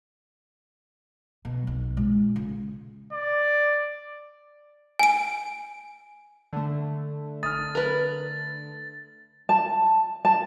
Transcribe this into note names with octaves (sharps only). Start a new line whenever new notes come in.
B2
B1
A#2 G#3
C#3
D5
G#5 D7
D3 A3
D#6 F6 A6
A#4 B4
A5
A5